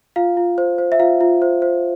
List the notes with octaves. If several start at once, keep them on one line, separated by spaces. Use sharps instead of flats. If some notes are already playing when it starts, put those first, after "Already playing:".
F4 F5
F4
C5
C5
E5
F4 F5
F4
C5
C5